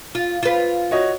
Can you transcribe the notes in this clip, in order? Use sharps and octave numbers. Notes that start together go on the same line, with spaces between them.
F4
F4 B4
F#4 C#5 D#5